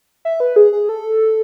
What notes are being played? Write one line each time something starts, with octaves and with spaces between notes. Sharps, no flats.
E5
B4
G#4
G#4
A4